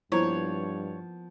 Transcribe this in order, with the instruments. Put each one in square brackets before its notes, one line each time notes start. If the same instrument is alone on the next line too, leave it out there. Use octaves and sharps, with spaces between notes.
[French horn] G2 [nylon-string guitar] F3 A#3 B3 [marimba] E4 C5 A#5 [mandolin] C#5